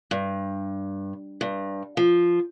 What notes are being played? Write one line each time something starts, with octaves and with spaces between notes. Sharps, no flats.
G2
G2
F3